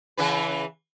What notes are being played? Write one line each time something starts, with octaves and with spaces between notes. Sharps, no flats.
C#3 E3 B4